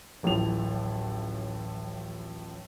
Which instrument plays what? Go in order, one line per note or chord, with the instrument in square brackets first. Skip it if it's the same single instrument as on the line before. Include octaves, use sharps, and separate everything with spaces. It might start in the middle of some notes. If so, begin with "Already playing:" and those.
[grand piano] D1 A1 A2 F3 F7